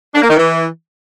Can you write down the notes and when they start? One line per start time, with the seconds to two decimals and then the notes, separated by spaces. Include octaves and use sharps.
0.15 D4
0.22 A#3
0.29 D#3
0.36 E3